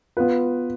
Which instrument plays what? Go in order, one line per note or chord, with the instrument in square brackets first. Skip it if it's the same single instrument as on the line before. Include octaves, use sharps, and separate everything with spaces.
[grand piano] B3 F4 B4